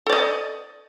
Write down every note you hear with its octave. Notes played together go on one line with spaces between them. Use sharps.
A4 D5 D#5